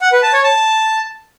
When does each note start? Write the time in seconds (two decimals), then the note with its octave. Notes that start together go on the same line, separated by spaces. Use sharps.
0.02 F#5
0.12 B4
0.23 A5
0.33 C#5
0.44 A5